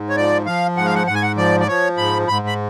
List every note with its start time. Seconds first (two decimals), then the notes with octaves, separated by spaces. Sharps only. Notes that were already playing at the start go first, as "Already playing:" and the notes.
Already playing: G#2
0.09 C#5
0.16 F3 D5
0.46 F3 F5
0.76 G#2 F#5
0.85 F5
0.95 F#5
1.07 G#2 F#5
1.15 G#5
1.22 F#5
1.37 F3 D5
1.60 D5
1.67 F3 C#5
1.97 G#2 B5
2.28 G#2 B5
2.47 B5